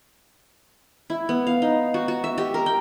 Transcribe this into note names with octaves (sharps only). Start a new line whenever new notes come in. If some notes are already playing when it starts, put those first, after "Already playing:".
E4
B3
F5
D#4
F#4
F#4
E5
G4
A#4
G5